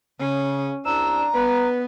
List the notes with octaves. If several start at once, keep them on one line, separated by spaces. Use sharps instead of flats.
C#3 C#4
C2 D4 A#5 E6
B3 B4